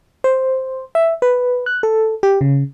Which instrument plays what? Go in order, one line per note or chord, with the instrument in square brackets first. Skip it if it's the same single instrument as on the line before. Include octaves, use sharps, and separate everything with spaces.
[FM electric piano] C5
E5
B4
F#6
A4
G4
C#3